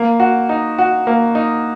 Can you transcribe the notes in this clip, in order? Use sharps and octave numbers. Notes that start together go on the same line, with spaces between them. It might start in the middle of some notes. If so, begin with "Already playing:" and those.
Already playing: A#3
F#4
D#4
F#4
A#3
D#4